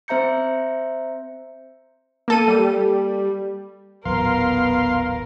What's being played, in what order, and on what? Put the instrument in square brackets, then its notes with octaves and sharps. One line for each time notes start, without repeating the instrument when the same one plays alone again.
[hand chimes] C4 C5 E5 A#5 G6 C#7
[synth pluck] A#3 A4 D#7
[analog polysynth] G3
[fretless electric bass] D#1 A1 F#3 [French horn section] B3 B4 [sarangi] A#4 [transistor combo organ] F5 C6